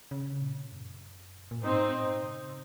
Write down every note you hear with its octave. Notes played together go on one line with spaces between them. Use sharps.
C#3
A#2
F#2
A#2
G#2 C4 D#4
A#2
C#3